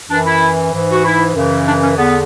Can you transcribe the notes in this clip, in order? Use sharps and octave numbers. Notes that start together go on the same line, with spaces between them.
F#2 E3 D4
E4
G#2 E3
F#4
E4
F#2 C#3 E3
D4
C#4
E2 D3 B3